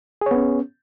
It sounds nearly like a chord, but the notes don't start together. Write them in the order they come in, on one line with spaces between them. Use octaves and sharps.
G#4 C#5 B3 C#4